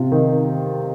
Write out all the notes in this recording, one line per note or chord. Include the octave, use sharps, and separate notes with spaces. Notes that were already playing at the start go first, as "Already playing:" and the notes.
Already playing: C3 F4
D#3